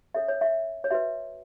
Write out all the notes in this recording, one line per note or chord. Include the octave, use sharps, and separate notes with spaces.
C#4 A4 C#5 E5
C#5
E5
C#5
F#4 B4 E5